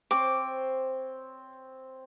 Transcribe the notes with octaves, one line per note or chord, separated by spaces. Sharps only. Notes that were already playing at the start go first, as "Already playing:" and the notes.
C4 C5 C#5 D6